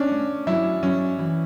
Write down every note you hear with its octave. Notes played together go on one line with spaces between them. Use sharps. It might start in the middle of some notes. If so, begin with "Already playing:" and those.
Already playing: C#4 D4
A3
F#3 E4
F#3 C#4
E3